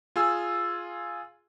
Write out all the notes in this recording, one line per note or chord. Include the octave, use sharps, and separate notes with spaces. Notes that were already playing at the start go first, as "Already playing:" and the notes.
F4 G#4 G#5 E6